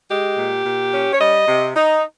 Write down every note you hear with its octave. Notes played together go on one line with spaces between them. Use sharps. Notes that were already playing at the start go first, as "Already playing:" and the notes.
G#3 G4
A#2
A#2
C#4
C#5
G3 D#5
C3
D#4